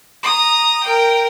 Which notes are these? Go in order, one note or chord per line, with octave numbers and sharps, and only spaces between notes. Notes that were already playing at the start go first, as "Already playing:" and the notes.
A#5 D#6
A#4 G5